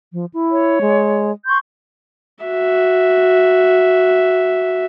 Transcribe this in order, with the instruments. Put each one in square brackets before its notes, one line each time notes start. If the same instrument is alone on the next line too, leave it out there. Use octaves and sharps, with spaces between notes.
[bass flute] F3
E4
[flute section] C#5
[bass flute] G#3
[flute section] C6 C#6 G6
[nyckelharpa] F#4 E5